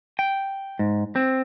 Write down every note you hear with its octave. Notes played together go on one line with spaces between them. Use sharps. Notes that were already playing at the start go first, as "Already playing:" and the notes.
G5
G#2
C4